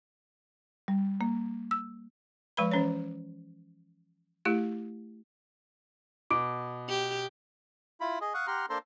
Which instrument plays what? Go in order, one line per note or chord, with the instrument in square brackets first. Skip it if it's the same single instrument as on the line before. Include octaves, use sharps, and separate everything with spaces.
[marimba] G3
A#3
E6
[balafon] F3 G#3 B4 B5
E3 C#4 C#5
A3 E4 G4
[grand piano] B2 [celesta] D6 D7
[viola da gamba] G4
[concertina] E4 F4 B5
G#4 D#5
F5 F#5 C#6 D#6 F#6
G4 F#5 A#5 C6 F6
A#3 D4 A4 C5 A#5 C6